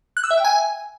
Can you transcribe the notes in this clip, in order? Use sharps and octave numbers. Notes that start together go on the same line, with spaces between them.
F#6
E6
E5
G5
G#5